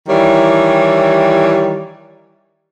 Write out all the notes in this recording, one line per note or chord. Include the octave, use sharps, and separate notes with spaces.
D#3 E3 G3 E4 C#5 D5